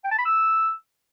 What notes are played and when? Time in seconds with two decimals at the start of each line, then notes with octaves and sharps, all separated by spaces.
0.04 G5
0.11 A5
0.18 B5
0.26 E6